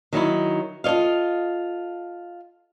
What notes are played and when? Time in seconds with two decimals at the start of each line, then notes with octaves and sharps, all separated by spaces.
0.13 D#3 F#3 D#4 E4
0.84 F4 A4 C#5 D#5 F5